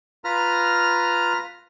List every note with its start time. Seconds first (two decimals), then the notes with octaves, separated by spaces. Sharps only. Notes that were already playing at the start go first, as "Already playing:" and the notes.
0.24 F4 B4 A#5 F6